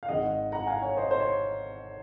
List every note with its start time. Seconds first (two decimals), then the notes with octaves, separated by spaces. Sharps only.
0.03 F5
0.09 G#1 G#2 D#3 D#5 F#5
0.52 F#5 A#5
0.67 F5 G#5
0.82 C#5
0.97 C5 D#5
1.11 C5
1.19 C#5